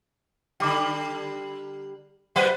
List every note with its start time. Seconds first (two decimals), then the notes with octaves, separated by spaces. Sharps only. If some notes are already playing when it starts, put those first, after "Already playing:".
0.60 D3 G3 G5 D6
2.36 F#3 G3 B4 C5 F#5 G5